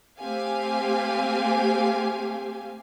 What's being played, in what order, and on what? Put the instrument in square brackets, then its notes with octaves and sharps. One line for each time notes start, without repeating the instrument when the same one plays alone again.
[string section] A3 C4 G4 F5 G#5